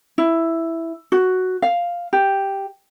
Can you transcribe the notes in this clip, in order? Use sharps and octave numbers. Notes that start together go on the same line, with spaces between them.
E4
F#4
F5
G4